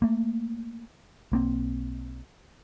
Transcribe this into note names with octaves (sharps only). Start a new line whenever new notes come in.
A3 A#3
B1 A#3 C4